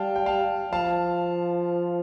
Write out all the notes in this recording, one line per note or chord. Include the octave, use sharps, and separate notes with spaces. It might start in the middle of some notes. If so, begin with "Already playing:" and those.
Already playing: G3 F5 G5 A5
G5
F5 A5
F3 F5 A5